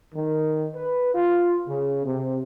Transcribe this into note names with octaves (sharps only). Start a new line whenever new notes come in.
D#3
B4
F4
C#3
C3